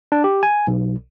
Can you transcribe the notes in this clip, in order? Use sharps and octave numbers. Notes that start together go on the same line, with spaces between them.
D4
G4
G#5
B1